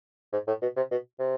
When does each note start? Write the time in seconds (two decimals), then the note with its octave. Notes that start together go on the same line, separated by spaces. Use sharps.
0.32 G#2
0.47 A2
0.62 B2
0.76 C3
0.91 B2
1.19 C3